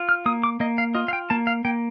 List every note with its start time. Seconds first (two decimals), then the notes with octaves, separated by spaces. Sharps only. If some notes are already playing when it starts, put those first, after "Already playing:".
Already playing: F4
0.09 F6
0.26 A#3 D#6
0.44 D6
0.60 A#3 D#5
0.78 F5
0.95 F4 D#5
1.08 F5
1.13 G5
1.30 A#3 A5
1.47 F5
1.65 A#3 G5